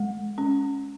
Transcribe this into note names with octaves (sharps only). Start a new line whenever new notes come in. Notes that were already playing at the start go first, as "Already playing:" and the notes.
Already playing: G#3
C#4